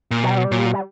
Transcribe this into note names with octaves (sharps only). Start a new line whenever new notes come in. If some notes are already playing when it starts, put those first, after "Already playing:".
A#2
B2 F#3
G3
F#3
G3
A#2 F#3
G3
F#3
G3